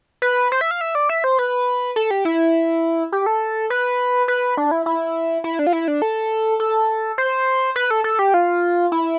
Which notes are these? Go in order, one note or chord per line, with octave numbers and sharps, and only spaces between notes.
B4
C5
E5
F5
E5
D5
E5
C5
B4
A4
G4
E4
G4
A4
B4
B4
D4
E4
E4
E4
D4
F4
E4
D4
A4
A4
C5
B4
A4
A4
G4
F4
E4